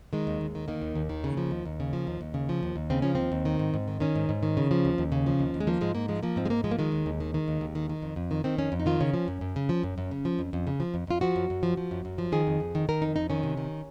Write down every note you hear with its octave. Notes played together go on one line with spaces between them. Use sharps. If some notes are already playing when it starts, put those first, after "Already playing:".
D#3 G#3
D#2
D#2
D#3
D#3 A#3
D#2
D#2
D#3
C#3
F3
D#2
D#2
C#3
F3
D#2
D#2
C#3
F3
D#2
D#2
C#3 C4
F3 C#4
D#2 C4
D#2
D#3
G#2
G#2
D#3
D#3 C#4
G#2
G#2
D#3
C#3
F3
D#2
D#2
C#3
F3
D#2
D#2
G#3
F3 A#3
G#2 G#3
G#2 A#3
F3 G#3
F3 A#3
G#2 C4
G#3
G#2 A#3
F3 G#3
A#3
D#3 G#3
D#2
D#2
D#3
D#3
D#2
D#2
D#3
D#3
F2
F2
D#3
D#3 C4
F2 C#4
F2
D#4
D#3 F4
C#3 C#4
F3
F#2
F#2
C#3
F3
F#2
F#2
C#3
F3
F2
F2
C#3
F3
F2
F2 F4
F3 F#4
F#2
F#2
F3
F3
F#2
F#2
F3
D#3 G#4
F2
F2
D#3
D#3 A#4
F2 D#4
F2 D#4
D#3 C#4
C3
D#3